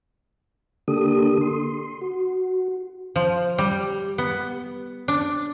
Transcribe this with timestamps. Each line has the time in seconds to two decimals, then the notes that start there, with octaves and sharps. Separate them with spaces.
0.88 D3 A#3 D4 G4 A4 D#6
1.41 C6
2.01 F#4
3.16 F3
3.58 G3
4.18 B3
5.08 D4